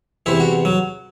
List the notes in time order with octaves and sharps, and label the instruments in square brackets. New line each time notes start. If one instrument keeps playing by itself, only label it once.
[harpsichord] E2 C3 E3 E4
F#4
F#3